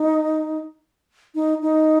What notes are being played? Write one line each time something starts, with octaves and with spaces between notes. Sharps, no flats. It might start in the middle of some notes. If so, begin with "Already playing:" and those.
Already playing: D#4
D#4
D#4